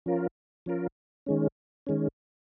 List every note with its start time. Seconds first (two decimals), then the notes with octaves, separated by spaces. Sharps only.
0.06 F3 C#4 F4 A#4
0.66 F3 C#4 F4 A#4
1.26 D#3 G#3 C#4
1.87 D#3 G#3 C#4